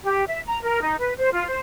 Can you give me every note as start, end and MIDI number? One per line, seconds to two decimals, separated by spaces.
0.03 0.25 67
0.27 0.40 76
0.46 0.58 82
0.63 0.81 70
0.82 0.96 63
0.99 1.13 71
1.18 1.30 72
1.32 1.46 65
1.46 1.60 72